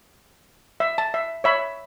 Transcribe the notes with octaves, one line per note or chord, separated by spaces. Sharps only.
E5
A5
E5
C#5 E5 B5